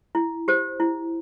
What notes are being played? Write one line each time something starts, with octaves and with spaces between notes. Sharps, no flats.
E4
G4 C5
E4